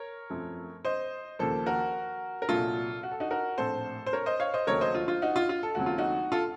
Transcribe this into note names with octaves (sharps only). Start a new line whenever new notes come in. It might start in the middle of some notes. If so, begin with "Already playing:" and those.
Already playing: A#4 C#5
F#2 F3 A3 C4
C5 D#5
D#2 C#3 F3 A#3 A4 C5
F#4 A#4
A#4
C2 A#2 F#3 F4 A4
F#4
A4
D#4 F#4
F#4 A#4
A#1 A2 A3 C4 A4 C5
C5
A#4 C#5
C5 D#5
C#5 F5
C5 D#5
D#2 C#3 F#3 A3 A#4 C#5
C5 D#5
F4
F4
D#4 F#4
F4
F4
A4
D#2 C#3 F#3 A3 C4 F#4
F4
D#4 F#4
F4 A4